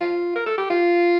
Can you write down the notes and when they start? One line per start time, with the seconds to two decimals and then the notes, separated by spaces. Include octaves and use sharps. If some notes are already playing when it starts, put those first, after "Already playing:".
0.01 F4
0.35 A#4
0.46 A4
0.58 G4
0.70 F4